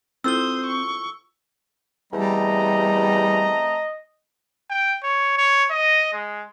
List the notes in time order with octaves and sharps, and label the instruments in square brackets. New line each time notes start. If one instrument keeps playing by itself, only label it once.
[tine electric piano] C4 [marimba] E4 F4 A4 [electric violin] C5 D#6 [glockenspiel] E6 G7
[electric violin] C#6
[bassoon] E2 [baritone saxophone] G3 [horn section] A3 C4 A#5 [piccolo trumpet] D#5
[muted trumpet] G5
C#5
C#5
D#5
G#3